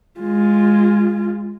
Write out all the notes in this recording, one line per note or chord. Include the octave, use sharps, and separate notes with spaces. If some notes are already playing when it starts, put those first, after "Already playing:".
G#3 F4